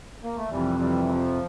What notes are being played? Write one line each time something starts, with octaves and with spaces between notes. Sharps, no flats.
A#3
A3
F2 C3 E3 G3
E3 G3
F3